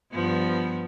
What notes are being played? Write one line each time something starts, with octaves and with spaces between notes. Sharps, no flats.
G2 F3 B3